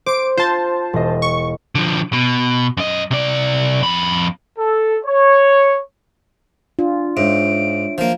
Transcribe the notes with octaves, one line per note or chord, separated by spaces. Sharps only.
C5 D6 D7
F4 C5 A5
E1 D#5
C#6
D3 F3
B2
F#2 D#5
C3 D5
F2 B5
A4
C#5
D4 F4
G#2 D4 C#5 E5 D7
F3 A#3